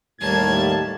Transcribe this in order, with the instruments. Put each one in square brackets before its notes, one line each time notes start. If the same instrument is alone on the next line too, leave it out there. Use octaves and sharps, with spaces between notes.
[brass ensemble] D#2 A2 [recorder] G3 [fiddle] A#3 A5 [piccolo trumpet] G#6